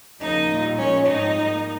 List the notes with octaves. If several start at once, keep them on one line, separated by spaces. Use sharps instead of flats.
D#2 C#3 F3 A#3 D#4 D#5
A#2 G3 A#3
A#2 F3 G#3 C#4 C#5
G#2 F3 G#3 C4 D#4 D#5
G#2 G3 A#3